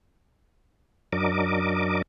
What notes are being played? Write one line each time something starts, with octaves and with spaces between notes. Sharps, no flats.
F#2 F#3 D4 A#4 D#5 D6